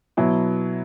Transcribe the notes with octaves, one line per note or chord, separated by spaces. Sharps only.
B2 F#3 E4